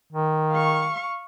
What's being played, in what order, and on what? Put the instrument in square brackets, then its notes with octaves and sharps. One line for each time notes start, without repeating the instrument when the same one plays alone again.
[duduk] D#3
[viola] F5 C#6